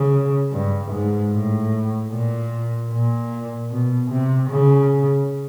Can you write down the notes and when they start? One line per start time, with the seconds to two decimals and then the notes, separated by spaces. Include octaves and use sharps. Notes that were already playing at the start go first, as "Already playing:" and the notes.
Already playing: C#3
0.52 G2
0.91 G#2
1.32 A2
2.11 A#2
2.91 A#2
3.71 B2
4.10 C3
4.50 C#3